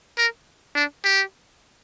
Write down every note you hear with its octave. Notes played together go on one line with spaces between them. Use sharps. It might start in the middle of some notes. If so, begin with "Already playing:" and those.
A#4
D4
G4